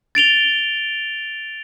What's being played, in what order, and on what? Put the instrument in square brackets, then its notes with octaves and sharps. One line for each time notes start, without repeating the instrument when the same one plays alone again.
[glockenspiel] A6 D7 F7 G7